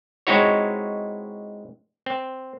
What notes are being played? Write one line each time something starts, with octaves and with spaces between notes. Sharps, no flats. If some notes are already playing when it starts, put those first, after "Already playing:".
G#3 C4 D#4 E4 F#4 C#5
C4